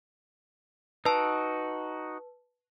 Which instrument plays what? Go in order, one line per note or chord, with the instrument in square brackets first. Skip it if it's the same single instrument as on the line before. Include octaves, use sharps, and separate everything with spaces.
[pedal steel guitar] D#4 F#4 [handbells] B4 A5